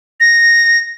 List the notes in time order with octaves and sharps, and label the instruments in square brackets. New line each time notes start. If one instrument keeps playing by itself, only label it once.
[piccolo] A#6